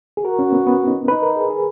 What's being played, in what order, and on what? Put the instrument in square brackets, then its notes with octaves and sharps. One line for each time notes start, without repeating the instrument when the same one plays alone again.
[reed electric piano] G#4
[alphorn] F#4 [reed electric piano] A#4
[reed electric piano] C#4
B3
B3
D#4
[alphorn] D#4 [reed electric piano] B4
[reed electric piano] A#4
G#4
G#4